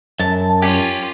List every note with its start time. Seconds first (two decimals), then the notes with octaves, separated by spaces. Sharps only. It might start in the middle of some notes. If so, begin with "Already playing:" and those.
0.20 F#2 A5
0.62 C#4 F4 G4 G#5